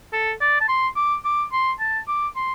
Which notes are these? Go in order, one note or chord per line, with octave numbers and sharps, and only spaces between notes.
A4
D5
A5
C6
D6
D6
C6
A5
D6
C6